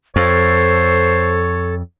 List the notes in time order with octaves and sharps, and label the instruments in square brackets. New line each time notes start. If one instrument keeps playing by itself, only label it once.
[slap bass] F2 [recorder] A4 [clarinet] C5 [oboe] C#5